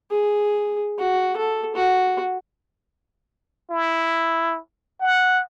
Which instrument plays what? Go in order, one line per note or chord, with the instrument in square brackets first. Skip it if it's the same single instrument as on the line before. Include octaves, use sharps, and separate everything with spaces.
[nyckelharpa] G#4
F#4
A4
F#4
[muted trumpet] E4
F#5